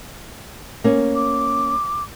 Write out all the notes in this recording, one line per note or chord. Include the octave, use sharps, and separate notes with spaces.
A#3 C#4
D6